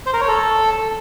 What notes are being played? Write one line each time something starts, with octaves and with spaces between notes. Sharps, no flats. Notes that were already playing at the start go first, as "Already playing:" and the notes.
C5
A#4
C#5
A4